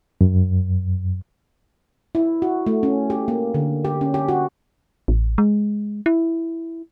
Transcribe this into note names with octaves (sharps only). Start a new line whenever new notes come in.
F#2
E4
F#4
A3
C#4
G4
A#3
D3
G4
C#4
G4
F#4
A1
G#3
E4